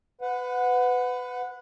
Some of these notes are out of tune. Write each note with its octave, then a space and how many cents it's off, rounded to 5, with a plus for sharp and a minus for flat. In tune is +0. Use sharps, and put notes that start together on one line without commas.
B4 +25 F#5 -15